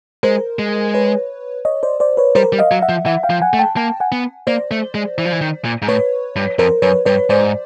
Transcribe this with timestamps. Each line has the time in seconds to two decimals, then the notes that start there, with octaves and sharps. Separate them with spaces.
0.23 G#3 A#4 C5
0.59 G#3
0.94 B4 C#5
1.65 C#5 D#5
1.83 C5 D5
2.00 C5 D5
2.17 B4 C#5
2.35 G3 A#4 C5
2.53 G3
2.59 D#5 F5
2.71 F#3
2.82 E5 F#5
2.89 F3
3.06 E3 E5 F#5
3.23 F5 G5
3.30 F3
3.42 F#5 G#5
3.53 A3
3.59 G5 A5
3.76 A#3 G5 A5
4.00 F#5 G#5
4.12 B3
4.47 A#3 C5 D5
4.71 A3
4.95 G#3
5.18 E3
5.25 F3
5.32 E3
5.41 D#3
5.65 A#2
5.82 G#2
5.88 A2 B4 C#5
6.36 G2
6.59 F2 A#4 C5
6.82 F#2 B4 C#5
7.06 G2 B4 C#5
7.30 G#2 C5 D5